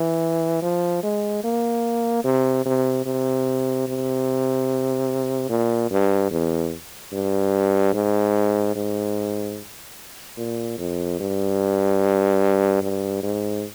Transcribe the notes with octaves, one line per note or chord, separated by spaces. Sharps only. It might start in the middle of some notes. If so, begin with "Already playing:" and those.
Already playing: E3
F3
G#3
A#3
C3
C3
C3
C3
A#2
G2
E2
G2
G#2
G#2
A#2
F2
G2
G2
G#2